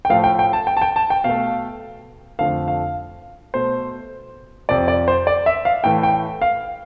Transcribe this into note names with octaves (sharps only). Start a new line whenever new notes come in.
G5
A2 F3 A3 F5
G5
G5
A5
G5
A5
G5
A5
G5
B2 A3 F5
F2 D3 F3 A3 F5
F5
B2 A3 C5
F2 C3 F3 D5
D5
C5
D5
E5
F5
A2 E3 A3 G5
G5
F5